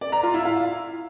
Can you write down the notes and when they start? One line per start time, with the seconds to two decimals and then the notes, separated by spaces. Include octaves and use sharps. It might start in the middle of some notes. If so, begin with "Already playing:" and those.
0.01 D5
0.12 A#5
0.23 F4
0.34 E4
0.45 F5